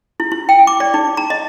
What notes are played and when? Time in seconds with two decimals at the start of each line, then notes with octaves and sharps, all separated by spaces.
0.20 E4
0.32 E4
0.49 G5
0.67 D6
0.80 D5
0.94 D#4
1.17 A#5
1.30 D#5